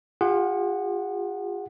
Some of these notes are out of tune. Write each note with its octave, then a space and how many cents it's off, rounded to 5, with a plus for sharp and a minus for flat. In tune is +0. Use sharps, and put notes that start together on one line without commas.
F4 +20 G#4 -45 F#5 +0